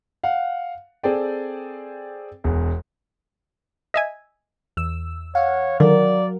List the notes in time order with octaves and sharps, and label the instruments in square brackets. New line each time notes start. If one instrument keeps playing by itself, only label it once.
[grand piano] F5 F#5
C4 G#4 A4 D5 G5
E1 E2
[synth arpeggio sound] D#5 E5 G#5
[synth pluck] E2 E6
[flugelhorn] C#5 [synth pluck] F5 F#5
[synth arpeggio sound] D3 D#3 [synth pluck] F#3 A#4 [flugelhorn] D5